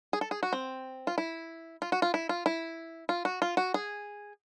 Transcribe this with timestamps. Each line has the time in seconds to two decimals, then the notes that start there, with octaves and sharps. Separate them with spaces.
0.13 G#4
0.21 A4
0.31 G#4
0.43 F#4
0.53 C4
1.07 F4
1.18 E4
1.82 F4
1.92 F#4
2.02 F4
2.14 E4
2.29 F4
2.46 E4
3.09 F4
3.25 F#4
3.42 F4
3.57 F#4
3.74 G#4